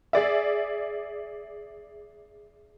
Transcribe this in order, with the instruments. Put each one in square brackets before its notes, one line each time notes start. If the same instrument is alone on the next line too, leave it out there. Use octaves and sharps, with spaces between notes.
[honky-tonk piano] G#4 D5 E5